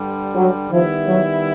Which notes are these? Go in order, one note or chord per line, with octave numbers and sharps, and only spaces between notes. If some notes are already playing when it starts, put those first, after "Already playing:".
Already playing: G2 D3 G3
F#3
D#3 F3 G3 B3 E4
F#3